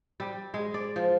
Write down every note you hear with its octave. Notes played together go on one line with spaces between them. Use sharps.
G3
G#3
D5
F3